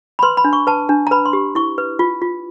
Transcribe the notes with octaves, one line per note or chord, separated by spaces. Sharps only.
B5
B4 C6
B5
D4
C#6
B4 A5
D4
A#5
B4 B5
C6
G4
E4 C#6
B4
F4
F4